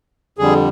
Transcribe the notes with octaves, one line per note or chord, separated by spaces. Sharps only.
F2 D3 G3 G#4